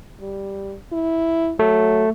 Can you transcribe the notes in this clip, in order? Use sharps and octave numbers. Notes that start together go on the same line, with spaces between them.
G3
E4
F#3 A3